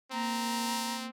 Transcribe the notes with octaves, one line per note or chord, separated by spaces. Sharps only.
A#3 C4 A#5